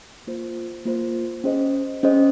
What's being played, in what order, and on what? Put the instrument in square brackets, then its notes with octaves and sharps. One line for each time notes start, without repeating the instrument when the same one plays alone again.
[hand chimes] A#3 F4 C5
A#3 F4 C5
C#4 G#4 C5 D#5
C#4 G#4 C5 D#5